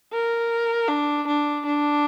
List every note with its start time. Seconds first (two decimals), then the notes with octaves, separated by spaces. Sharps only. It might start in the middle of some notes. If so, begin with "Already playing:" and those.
0.13 A#4
0.88 D4
1.27 D4
1.66 D4